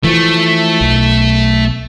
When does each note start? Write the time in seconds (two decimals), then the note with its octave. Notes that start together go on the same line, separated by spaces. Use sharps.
0.04 E3 F3 A3
0.81 B1